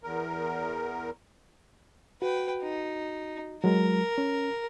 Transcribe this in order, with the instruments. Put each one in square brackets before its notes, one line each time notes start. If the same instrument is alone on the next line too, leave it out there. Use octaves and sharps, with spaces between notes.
[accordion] E2 A#4
[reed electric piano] F#4 [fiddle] B4 G5
[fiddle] D#4
[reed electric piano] F#3 G#3 [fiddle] A#4
[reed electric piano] C#4